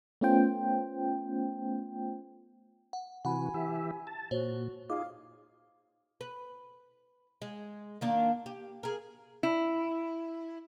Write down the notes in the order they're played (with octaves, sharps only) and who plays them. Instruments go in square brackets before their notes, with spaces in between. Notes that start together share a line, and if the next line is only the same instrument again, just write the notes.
[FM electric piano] A3 B3 C#4 F4 C5 G5
[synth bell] F#5
[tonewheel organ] C3 E3 F#4 [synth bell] F#5 B5 [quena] G#5
[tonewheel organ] E3 G4 E5
A5
[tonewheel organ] A#2 [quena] F#4 [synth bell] C5 C#5
[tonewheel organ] D#4 F4 G#4 [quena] F5 [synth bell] D6
[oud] B4
G#3
D#3 A#3 D4
G4
G#4 A#4
[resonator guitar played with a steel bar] E4